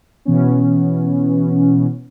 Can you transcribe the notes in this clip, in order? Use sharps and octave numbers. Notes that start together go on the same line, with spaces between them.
B2 E3 B3 C#4